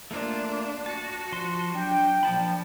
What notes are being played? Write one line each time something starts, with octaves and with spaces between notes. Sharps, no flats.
A3 A#3 D4 F4
F#4 A5
F3 A5 C6
F#3 D4 G5
A#2 F3 A5 B5